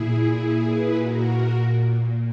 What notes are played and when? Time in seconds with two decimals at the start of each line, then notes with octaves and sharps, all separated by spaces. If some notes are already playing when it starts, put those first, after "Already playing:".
Already playing: A#2 E4 G#4
0.31 A#2
0.63 G#4 B4
0.94 A#2 F#4 A#4
1.57 A#2